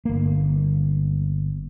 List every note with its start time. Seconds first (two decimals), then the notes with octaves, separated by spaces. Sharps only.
0.05 G1 A#3